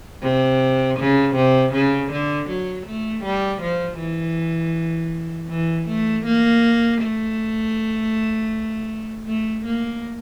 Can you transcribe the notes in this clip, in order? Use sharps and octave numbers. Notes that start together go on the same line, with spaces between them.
C3
C#3
C3
C#3
D3
F#3
A3
G3
F3
E3
E3
A3
A#3
A3
A3
A#3